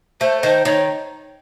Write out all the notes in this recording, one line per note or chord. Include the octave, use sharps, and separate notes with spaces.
A3 C5
D#3 C5
D#3 C#5